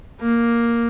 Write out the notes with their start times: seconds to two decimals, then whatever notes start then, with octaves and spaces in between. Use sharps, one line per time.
0.20 A#3